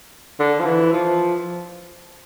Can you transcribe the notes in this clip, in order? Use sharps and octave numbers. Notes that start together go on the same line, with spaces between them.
D3
F3
E3
F3